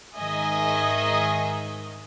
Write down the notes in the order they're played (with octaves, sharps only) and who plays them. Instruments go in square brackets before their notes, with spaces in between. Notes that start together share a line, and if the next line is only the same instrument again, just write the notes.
[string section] G#2 D#3 G#4 D#5 E5 G#5